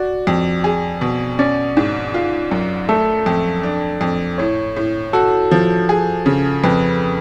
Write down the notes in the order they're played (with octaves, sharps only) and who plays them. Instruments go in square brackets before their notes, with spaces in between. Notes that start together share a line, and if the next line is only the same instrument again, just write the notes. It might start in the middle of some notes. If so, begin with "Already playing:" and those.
Already playing: [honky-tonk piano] F#4 [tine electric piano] D5
[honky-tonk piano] F2
G#4
B2
[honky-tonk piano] C#4 [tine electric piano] D5
[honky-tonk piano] G#2
F4
F#2
[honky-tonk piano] A3 [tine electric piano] A4
[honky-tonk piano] F2
D4
F2
[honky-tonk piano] A2 [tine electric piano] C#5
[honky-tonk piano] A2
[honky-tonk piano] F#4 [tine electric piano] A4
[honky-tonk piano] F3
G#4
C#3
[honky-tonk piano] F2 [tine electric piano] B4